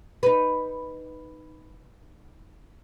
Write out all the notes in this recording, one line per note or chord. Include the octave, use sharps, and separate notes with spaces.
D#4 B4